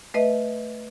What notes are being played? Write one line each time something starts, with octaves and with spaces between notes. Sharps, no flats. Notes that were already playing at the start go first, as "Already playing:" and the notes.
A3 B4 D#5 E5